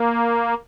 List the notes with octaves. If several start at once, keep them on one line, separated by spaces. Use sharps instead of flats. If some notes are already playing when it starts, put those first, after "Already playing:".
Already playing: A#3